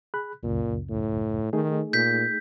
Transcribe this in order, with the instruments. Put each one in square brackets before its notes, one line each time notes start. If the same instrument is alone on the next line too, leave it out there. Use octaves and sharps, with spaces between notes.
[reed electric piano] G#4 B5 F#6
[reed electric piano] C#2 F#2 C#3 [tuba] A#2
[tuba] A2
[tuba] D#3 [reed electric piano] A3 D#4 G#4
[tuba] A#2 [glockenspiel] G6 B6